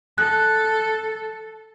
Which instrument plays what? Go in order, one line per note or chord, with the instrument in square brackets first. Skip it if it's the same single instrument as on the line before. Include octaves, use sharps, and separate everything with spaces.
[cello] A4 [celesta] F#6